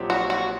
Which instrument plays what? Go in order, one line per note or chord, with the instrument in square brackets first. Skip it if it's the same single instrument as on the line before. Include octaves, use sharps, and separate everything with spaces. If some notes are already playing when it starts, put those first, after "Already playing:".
Already playing: [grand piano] A#1 A#2 F#3 C4 G4
[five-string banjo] F#4
F#4